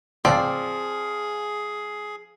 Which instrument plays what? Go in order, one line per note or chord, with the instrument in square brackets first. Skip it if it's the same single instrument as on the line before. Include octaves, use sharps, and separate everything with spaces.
[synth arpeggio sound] C#2 A2 C#3 [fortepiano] F3 [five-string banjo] C4 D5 [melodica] G#4